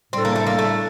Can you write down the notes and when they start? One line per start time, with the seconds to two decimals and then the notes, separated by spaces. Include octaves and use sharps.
0.13 A2 G3 C4 D4 A4
0.25 A#3
0.36 A3
0.46 A#3
0.59 A3